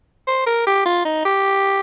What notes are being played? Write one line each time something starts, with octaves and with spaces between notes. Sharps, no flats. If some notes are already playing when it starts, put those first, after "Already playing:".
C5
A#4
G4
F4
D#4
G4